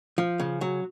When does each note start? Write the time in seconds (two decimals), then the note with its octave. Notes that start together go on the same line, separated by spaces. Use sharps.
0.18 F3
0.40 C#3
0.61 F#3